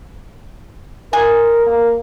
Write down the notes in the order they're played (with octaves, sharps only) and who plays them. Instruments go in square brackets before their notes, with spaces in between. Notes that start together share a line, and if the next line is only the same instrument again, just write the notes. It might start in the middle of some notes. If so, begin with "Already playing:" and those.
[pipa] G#3 G#5 [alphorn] A#4
[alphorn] A#3